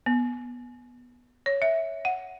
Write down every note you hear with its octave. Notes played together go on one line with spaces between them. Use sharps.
B3
C#5
E5
F#5